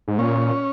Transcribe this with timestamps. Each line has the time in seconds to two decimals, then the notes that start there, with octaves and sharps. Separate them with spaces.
0.08 G#2
0.18 A#2 C#4